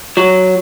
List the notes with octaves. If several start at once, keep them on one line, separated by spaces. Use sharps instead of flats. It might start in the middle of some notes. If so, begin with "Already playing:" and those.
F#3